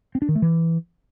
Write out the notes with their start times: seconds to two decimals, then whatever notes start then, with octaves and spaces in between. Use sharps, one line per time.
0.15 C4
0.22 D4
0.29 D#3
0.35 A3
0.42 E3